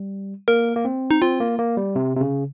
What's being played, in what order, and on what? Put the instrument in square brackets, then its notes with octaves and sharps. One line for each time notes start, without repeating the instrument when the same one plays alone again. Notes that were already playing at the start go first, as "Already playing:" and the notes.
Already playing: [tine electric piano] G3
[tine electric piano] A#3 [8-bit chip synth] A#4
[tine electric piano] A#3
C4
[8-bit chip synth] D#4
[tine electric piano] C4 [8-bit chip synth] F4
[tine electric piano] A#3
A#3
G3
C3
C3
C#3